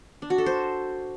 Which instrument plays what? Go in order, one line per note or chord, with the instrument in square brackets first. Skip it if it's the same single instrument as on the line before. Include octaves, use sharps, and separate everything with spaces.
[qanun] D4
F#4
A4
C5